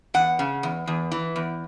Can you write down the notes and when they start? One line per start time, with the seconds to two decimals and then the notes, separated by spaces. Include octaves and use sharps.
0.14 E2 F#5
0.39 C#3
0.63 E2
0.87 E2
1.12 E3
1.36 E2